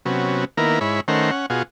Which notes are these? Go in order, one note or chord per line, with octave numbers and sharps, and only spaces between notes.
C3 F#3 B3 C#4
D#3 A#3 B3 E4 A#4
G#2 E4 C#5 B5
D#3 A3 C#4 A#4 C5 F#5
C#4 F#5
B2 F4 F#4 G#4